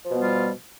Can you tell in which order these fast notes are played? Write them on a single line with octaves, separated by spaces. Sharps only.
F3 B2 B3 G3 F4